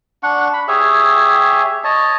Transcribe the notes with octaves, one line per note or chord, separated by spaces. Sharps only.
D4 F#5 C#6
B5
G4 G#4 C#5 E5
C#5 D#5 A5